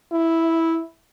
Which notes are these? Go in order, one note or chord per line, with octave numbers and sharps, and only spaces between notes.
E4